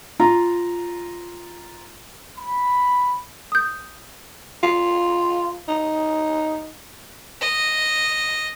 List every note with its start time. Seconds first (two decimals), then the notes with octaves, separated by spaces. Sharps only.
0.20 F4 A#5
2.38 B5
3.52 D#6 G6
4.63 F4
5.68 D#4
7.41 D#5